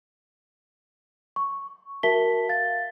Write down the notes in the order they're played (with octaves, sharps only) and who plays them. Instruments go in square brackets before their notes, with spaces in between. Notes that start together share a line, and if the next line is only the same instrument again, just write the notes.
[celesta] C#6
F#4 A#4 E5 A5 B6 G7
F5 A6